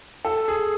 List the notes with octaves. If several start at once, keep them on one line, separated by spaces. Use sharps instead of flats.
A4
G#4